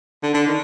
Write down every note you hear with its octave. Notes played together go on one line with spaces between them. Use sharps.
D3
D3
D#3